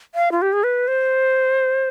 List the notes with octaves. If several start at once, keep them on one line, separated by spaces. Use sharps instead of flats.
F5
F4
G4
G#4
B4
C5